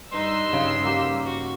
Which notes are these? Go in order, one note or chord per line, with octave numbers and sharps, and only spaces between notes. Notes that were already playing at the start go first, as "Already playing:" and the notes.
G2 D#4 B4 C6 E6
C#3
A#3 G4
F#4